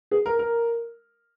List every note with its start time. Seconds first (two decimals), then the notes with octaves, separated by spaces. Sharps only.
0.11 G#4
0.26 A#4
0.39 A#4